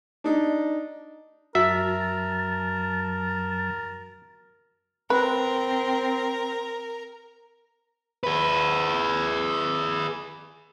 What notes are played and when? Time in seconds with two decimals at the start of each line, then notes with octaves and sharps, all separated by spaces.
0.24 D4 D#4
1.55 F#2 F#4 A#4 E5 A5
5.10 C4 A#4 B4
8.24 G#4 B4